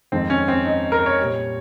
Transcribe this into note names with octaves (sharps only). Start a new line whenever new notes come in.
F2 D#3 G#3 C4
C#4
C4
D#4
A#4
C#5
G3
A#2